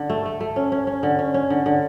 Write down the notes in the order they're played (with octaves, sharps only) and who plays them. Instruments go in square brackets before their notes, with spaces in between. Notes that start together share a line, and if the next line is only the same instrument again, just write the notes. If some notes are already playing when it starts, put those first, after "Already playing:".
Already playing: [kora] D3 D4
A3
A3
A3
C#4
C#4
C#4
D3
C#4
C#4
D3
D3